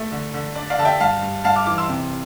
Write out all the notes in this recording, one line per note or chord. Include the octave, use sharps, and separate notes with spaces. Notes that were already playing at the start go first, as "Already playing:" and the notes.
Already playing: A3 E5
D3
D3
D4 D5
D5 F5
D3 A5
E5 G5
G2 F5 A5
G2
G2 F5 A5
D6 F6
E3 D6 F6
C6 E6
C3